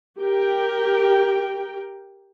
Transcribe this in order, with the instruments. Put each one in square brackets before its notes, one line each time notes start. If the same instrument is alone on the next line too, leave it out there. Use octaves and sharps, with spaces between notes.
[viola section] G4 A#4 G5